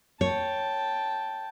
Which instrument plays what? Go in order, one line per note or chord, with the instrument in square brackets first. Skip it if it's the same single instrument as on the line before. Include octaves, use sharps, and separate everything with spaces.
[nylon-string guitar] C#5 [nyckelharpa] G5 A5